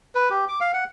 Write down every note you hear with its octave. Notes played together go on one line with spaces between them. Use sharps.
B4
G4
D6
F5
F#5